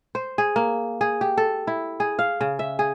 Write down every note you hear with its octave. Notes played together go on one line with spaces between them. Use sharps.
C5
G#4
A#3
G#4
G4
A4
E4
G#4
F5
C#3
E5
G#4